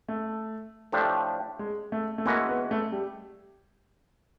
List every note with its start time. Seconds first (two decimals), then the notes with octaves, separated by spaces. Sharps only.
0.09 A3
0.92 A2 F3 A3 D4 G4
1.59 G#3
1.92 A3
2.18 A3
2.25 E3 G#3 A#3 C#4 F#4 B4
2.49 B3
2.71 A3
2.92 G3